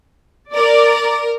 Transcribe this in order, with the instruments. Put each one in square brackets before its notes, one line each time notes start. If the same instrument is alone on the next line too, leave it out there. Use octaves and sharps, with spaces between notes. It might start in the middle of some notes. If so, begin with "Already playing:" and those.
[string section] A#4 [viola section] D5